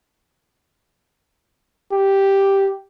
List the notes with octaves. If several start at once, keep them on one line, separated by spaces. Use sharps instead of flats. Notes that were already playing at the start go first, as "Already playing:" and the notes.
G4